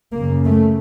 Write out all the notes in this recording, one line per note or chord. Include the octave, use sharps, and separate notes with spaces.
F#2 C#3 A#3
A3